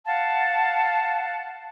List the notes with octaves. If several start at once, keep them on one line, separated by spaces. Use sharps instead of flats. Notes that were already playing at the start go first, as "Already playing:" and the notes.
F5 F#5 A5